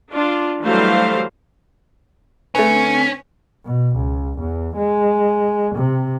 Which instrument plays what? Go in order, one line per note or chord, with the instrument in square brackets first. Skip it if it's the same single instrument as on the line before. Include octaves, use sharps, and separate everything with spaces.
[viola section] D4 F4
E3 F#3 G3 A3 C5 F5
[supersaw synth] D3 C4 C#5 [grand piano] A3 B4 [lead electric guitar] C#4 [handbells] G#5
[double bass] B2
C#2
E2
G#3
C3